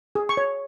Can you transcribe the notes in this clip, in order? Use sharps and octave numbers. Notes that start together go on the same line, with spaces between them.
G#4
C#6
C#5